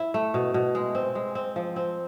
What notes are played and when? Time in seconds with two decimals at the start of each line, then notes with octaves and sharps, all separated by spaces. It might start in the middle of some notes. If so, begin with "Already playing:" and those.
Already playing: E4
0.14 A3
0.34 B2
0.54 B2
0.75 G#3
0.95 C4
1.15 G#3
1.35 C4
1.56 F3
1.76 C4